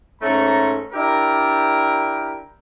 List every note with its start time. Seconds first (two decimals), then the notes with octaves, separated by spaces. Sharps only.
0.21 G#2 A3 C#4 A#5
0.93 D4 E4 G4 A#4